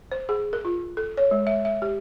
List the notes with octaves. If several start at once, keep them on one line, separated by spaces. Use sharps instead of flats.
C5
G#4
A#4
F4
A4
C#5
G#3
E5
E5
G4